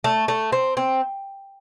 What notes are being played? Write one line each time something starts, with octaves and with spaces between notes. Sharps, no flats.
A3
A3
C4
C4